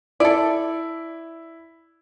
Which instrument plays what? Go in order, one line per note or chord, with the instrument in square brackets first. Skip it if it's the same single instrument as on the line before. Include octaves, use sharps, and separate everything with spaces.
[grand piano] E4 [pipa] A4 D5